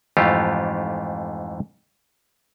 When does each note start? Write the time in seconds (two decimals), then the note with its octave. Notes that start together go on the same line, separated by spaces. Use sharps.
0.17 F2 G#2 E3 A3 F4 G4